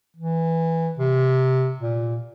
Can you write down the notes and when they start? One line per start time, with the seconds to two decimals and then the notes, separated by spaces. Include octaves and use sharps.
0.17 E3
0.99 C3
1.80 A#2